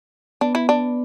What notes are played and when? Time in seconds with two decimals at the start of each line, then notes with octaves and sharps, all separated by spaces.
0.41 B3 D4
0.55 E4
0.69 D4